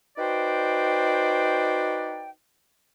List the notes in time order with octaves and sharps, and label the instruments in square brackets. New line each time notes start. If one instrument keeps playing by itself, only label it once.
[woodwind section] D#4 F#4 B4 C5 D5 G5